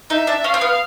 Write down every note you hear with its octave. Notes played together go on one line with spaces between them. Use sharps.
D#4 E5
D4
C#4 F5
C4
B3